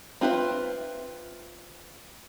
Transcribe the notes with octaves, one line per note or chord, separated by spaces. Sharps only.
C4 F4 B4 C#5 E5